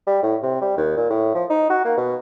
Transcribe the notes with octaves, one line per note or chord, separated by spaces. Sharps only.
G3
A2
C3
G3
D#2
A#2
A2
F3
D#4
F#4
A#3
B2